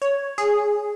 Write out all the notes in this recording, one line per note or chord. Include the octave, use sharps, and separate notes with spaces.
C#5
G#4